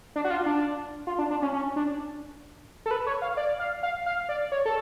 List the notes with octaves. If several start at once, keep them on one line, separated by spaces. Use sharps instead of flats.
D4
F#4
F4
D4
F4
D4
D4
C#4
C#4
D4
A4
B4
C#5
F5
D5
F5
F5
F5
D5
C#5
A4